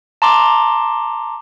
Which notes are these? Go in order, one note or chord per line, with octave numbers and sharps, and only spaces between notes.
A5 A#5 C6 D6